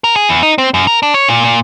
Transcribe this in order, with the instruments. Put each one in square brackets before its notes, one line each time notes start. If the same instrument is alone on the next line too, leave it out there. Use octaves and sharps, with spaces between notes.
[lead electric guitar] A#4
G#4
E2
D#4
C4
F#2
A#4
D4
C#5
A#2
A#2